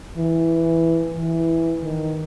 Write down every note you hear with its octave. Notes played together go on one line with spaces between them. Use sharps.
E3
E3
D#3